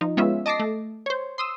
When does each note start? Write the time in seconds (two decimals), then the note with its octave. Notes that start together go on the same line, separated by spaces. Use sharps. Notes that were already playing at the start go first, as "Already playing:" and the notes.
0.01 F3 D#4
0.17 G#3 B3 C#4 F4 E5
0.46 D#5 A5 D6 A#6 C7
0.60 A3
1.06 C5 C#5
1.38 C6 D#6 E6